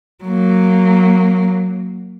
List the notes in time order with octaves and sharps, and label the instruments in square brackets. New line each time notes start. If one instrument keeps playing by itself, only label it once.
[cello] F#3 A#3